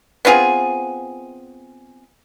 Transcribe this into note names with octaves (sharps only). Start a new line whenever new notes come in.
B3 C4 F4 G#4